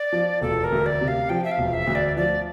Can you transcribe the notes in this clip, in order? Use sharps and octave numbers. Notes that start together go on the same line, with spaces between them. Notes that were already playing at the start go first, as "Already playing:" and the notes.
Already playing: D5
F3
E1 A4
A#4
D2
D5
C3
F5
F3 G5
E5
F5
E1
E5
D2
D5
F3 D5